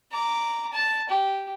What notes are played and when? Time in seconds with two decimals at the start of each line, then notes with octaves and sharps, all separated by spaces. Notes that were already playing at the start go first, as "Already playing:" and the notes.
0.11 A#5 D6
0.73 A5
1.09 G4